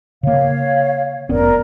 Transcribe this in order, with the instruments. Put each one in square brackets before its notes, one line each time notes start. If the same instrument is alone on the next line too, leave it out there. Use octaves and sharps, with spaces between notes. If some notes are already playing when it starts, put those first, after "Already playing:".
[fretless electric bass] C#3 A#3 [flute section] C#5 F5
[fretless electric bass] F1 B3 C#4 [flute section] A#4 D5